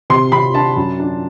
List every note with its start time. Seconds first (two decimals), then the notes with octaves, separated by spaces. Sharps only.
0.10 C3 C6
0.32 C3 B5
0.54 D4 A5
0.76 F#2
1.00 D4